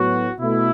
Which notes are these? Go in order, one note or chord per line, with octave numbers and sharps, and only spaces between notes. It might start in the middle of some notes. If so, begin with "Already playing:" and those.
Already playing: A2 F#3 B3 F#4
B2 A3 E4